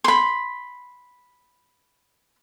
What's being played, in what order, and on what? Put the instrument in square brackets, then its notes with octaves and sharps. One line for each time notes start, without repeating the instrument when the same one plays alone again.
[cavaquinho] B5 C6